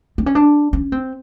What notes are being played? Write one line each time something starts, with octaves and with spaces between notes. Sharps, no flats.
C4
C#4
D4
C#4
C4